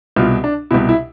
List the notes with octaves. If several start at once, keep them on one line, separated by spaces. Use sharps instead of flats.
C2 B2 F4
D4
C2 B2 E4
E4